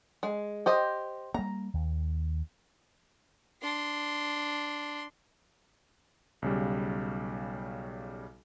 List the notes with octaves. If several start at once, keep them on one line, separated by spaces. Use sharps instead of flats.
G#3
G4 C5 D#5
G3 A#3 A#5
D#2
D4 C6
B1 C#3 G3